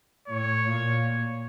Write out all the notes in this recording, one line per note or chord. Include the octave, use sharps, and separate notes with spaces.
A2 C#5
A#2